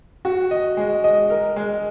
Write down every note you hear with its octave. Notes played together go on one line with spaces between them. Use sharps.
F#4
D#5
G#3
D#5
A#4
G#3